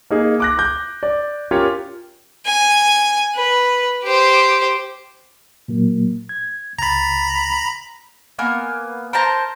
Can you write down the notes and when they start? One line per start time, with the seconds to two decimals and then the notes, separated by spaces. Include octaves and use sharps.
0.11 A#3 D#4 G#4
0.40 D6 F#6 A#6
0.58 D6 G6
1.03 D5
1.51 C#4 F4 G4 A#4 C#5
2.46 G#5
3.36 B4
4.04 G4 C5
5.68 A#2 F#3 A#3
6.29 G#6
6.79 C#2 A#5 B5 A6
8.39 A#3 B3 G#5
9.13 A#4 C5 A5 A#5